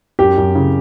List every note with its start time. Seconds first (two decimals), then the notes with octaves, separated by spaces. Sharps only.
0.19 F#2 G4
0.37 F#2
0.55 C#3